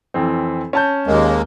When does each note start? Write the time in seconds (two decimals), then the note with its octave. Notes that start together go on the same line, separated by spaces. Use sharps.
0.14 F2 E3 C4
0.73 C#4 A5 G6
1.07 D#2 G#3 A#3